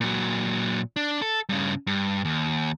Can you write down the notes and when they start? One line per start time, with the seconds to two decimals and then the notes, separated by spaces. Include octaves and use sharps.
0.01 A#2 F#3
0.96 D4
1.22 A4
1.49 G2 C#3
1.87 G2
2.25 D#2